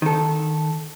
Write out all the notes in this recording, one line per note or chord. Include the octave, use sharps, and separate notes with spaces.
D#3 A4